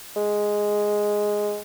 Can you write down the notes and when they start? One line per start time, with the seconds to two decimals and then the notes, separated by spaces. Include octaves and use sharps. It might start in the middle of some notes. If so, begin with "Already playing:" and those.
0.16 G#3